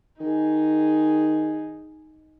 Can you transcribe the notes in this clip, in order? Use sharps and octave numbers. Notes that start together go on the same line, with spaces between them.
D#3 D#4 G#4